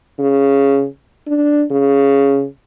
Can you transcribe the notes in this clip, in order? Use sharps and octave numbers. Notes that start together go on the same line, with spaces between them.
C#3
D4
C#3